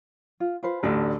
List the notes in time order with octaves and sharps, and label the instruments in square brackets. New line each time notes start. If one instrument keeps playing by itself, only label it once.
[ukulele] F4
F4 B4 C5
[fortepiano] A1 D2 [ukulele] D4 A4 A5